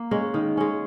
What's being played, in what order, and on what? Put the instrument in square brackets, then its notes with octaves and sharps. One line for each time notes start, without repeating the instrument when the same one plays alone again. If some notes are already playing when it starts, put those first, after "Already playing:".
Already playing: [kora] A#3
G#3 C#4
D#3
G#3 C#4